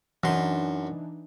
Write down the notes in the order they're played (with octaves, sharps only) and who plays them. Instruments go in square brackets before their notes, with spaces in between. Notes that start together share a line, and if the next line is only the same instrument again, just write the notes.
[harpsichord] F#2 C6 [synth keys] E3 D4 D#4